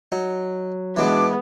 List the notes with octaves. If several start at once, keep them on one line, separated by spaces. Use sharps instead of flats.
F#3 D#4
B2 E3 G#3 B3 D4 D#4 D6